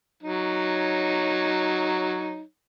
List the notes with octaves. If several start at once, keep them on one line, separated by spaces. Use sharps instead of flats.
F#3 D#4 C#5